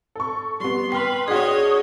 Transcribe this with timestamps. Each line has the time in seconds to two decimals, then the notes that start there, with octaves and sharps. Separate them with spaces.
0.15 A4 C#6
0.60 G3 B3 C6
0.92 B4 G5 C6 F6 C7
1.28 D4 F#4 G#4 C#5 D#5